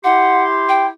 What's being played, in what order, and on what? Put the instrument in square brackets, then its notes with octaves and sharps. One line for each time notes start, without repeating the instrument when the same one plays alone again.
[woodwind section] E4 G4 C6 [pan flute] F#5
[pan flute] G5